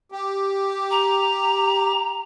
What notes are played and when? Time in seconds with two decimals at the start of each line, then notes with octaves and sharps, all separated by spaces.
0.12 G4
0.91 A#5